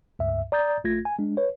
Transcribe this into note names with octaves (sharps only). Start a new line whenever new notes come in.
C#2 G2 E5
D5 A#5 D#6 G6 A6
A#1 A3 F4 G#6 A#6
G#5
G#3 D4
B4 C#5